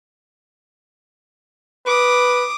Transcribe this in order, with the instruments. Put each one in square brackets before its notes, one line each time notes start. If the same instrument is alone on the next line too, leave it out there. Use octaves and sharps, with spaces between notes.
[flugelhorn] B4 [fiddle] D6 D#6